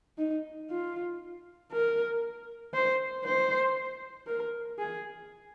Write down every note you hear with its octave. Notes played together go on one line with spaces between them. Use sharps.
D#4
F4
A#4
C5
C5
A#4
G#4